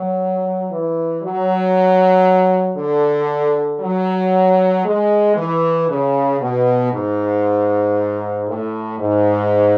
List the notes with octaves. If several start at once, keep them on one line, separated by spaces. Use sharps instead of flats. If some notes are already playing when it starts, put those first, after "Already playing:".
Already playing: F#3
E3
F#3
D3
F#3
G#3
E3
C#3
B2
G#2
A2
G#2